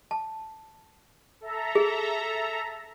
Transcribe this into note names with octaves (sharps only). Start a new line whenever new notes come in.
A5
A4 E5 A#5
G#4